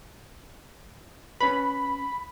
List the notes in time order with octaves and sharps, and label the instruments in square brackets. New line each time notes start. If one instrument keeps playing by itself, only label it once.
[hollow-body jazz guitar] C#4 B4 [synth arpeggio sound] B5